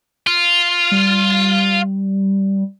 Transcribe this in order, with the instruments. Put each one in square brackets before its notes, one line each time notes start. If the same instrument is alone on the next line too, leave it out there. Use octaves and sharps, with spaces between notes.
[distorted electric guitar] F4
[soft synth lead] G3